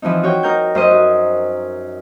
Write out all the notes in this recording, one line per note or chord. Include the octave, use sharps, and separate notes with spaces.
E3 F3 C4 D#4
F#4 C#5 G5
D#4 A#4 G6
F#2 C5 D#5 D#6
F#4